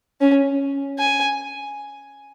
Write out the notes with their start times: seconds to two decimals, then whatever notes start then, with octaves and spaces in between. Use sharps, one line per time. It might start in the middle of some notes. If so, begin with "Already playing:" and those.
0.21 C#4
0.99 G#5